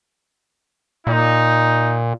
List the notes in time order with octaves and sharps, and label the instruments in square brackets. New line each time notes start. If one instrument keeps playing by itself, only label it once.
[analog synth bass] A#2 [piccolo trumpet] D#4